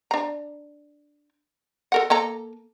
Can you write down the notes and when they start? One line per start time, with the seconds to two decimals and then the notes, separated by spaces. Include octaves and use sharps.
0.11 D4 A#5
1.92 A4 A#4 F#5
2.10 A#3 A4 A#5